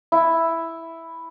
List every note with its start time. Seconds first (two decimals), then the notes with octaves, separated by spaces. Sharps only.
0.12 E4